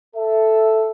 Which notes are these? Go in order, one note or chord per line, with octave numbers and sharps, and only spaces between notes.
A4 E5